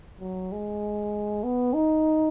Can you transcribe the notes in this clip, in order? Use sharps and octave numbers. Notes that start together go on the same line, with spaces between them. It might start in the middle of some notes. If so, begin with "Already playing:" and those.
F#3
G#3
B3
D#4